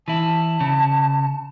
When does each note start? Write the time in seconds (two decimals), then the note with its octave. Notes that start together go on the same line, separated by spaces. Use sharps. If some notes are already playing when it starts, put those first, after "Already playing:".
0.08 E3 E4 A5
0.60 C#3